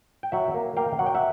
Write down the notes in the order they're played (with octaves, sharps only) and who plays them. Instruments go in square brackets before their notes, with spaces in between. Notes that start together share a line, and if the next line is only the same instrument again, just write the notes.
[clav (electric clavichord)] G5
F#3 E5 F#5
A#3
A#3 F5 G5
F#3 F#5
G5
E5 F#5